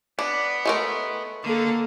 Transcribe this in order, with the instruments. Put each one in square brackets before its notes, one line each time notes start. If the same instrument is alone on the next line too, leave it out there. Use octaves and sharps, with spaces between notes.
[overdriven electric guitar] B3 [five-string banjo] D4
[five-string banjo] G#3 A3 A#4
[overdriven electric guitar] D3 [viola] A#3 A4